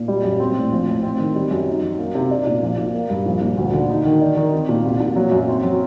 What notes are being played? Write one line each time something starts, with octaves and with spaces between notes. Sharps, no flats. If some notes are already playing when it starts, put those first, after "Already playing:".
Already playing: A#2
G3
F#2
C4
A2
A#1
A2
C4
D#3
G3
F#2
D#4
F#3
A#3
C3
D4
A#2
A#1
A#2
A#3
G2
A#1
A#2
D2
D3
D#4
D#3
D4
D#3
C4
A#2
C2
A#2
F#3
F#2
C4
F#3